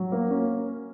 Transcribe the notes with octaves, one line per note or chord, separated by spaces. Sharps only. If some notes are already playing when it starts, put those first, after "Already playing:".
Already playing: F#3
A#3
C#4